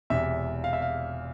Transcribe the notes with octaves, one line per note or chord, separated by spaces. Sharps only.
E1 E2 C3 E5
F5
E5
F5